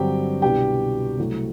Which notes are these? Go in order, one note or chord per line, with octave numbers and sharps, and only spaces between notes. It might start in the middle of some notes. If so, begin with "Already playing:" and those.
Already playing: G2 D3 F#3 C4 G4 G5
C2 B2 G3 D4 G4 G5
C2 C3 F#3 A3